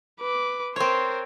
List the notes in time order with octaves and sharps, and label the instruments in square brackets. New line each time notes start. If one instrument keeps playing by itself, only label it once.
[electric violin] B4 D6
[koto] C4 C#5 [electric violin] A#4 C5